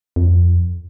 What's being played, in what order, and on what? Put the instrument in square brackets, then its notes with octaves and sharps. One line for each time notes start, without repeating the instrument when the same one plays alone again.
[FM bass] F2